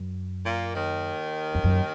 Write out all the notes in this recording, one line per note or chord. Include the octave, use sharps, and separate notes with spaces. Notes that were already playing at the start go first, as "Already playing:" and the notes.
Already playing: F#2
A#2 A#3
D#2 D#3
F2
F#2